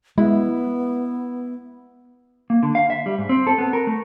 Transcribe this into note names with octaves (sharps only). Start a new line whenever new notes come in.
G#3 B3 E4
A#3
D3
F5
E5
G3
G#2
C4
A4
B3
A#4
A3